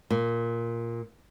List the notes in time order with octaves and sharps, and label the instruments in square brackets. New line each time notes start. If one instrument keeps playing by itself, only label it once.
[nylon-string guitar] A#2